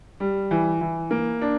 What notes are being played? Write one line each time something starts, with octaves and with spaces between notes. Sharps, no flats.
G3
E3
E3
A#3
D4